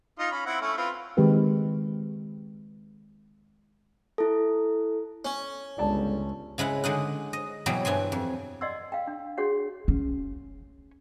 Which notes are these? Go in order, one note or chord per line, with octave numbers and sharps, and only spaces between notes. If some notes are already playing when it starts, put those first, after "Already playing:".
D#4 F4 D#5
C#4 B5
C4 E4 F#5
A3 C#4 E4
C4 F4 B4
D#3 G#3 C4 G4 B4
E4 A4
C#4
G1 C#2 D5 A5
C#3 G#3 E4 F#5
D3 G#3 D#4 F#5
D#5
B2 E3 F#3 G3
G2 E3 G#5 C6
F2
D5 D#5 F#5 C6 E6
F5 G5
D4
D4 F#4 G#4 C#5 F#5
C#4